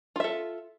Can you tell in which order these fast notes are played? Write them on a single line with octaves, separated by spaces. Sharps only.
F4 E5 A4